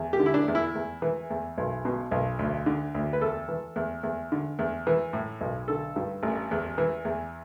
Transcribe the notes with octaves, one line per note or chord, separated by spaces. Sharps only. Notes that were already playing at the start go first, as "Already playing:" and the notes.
Already playing: E2
G4
D3
E4
D4
E2
E4
E2
E3
E2
B1
B2
B1
D2
D3
D2
B4
E2 A4
E3
E2
E2
D3
E2
E3
A2
B1
D3 A4
G2
A1
E2
E3
E2